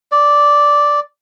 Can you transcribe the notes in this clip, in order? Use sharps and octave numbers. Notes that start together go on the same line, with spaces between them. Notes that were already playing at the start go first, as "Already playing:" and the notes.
D5